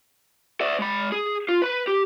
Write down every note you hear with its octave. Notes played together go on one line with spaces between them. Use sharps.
D5 E5
G#3 B5
G#4
F4
B4 B5
G4